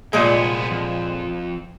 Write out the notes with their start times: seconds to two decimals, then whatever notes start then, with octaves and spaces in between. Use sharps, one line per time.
0.13 C2 A#2 F3 G#3 B3
0.71 F2